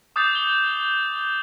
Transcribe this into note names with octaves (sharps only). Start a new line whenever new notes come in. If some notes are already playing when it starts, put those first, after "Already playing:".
D6 D#6 G6 A6 C7 F7
G7